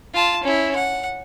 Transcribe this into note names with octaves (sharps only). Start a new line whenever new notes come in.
F4 A5
C#4 E4
F#5